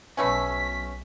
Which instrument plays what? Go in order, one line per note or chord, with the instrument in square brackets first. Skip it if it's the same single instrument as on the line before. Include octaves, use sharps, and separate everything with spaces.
[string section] B1 B6 [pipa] B2 A3 C#4